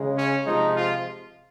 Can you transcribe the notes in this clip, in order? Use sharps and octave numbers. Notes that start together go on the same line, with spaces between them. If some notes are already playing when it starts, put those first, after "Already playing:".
Already playing: C#3 G#3
C#4
C3 F3 G#3 D#4
F4